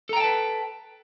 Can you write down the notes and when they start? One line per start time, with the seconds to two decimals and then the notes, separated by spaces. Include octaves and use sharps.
0.09 A4
0.13 A#5
0.16 G5
0.20 A5
0.24 B4